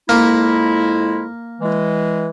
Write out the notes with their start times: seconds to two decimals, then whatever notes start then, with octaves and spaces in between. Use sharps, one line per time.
0.09 F2 G#3 A#3 E4
1.61 E3 G#3